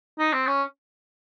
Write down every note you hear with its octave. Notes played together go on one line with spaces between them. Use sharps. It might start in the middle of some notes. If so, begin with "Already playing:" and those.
D#4
C4
C#4